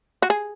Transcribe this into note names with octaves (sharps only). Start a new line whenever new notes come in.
F#4
G#4